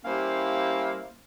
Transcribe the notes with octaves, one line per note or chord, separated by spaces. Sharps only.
G3 A#3 C#4 E4 C5 F5